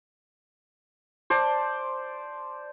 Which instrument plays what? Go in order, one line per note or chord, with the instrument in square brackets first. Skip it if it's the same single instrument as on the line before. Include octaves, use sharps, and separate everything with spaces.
[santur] C5 D5 A5